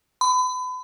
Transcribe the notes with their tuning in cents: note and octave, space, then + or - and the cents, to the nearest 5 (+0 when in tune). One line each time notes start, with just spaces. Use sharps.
B5 +35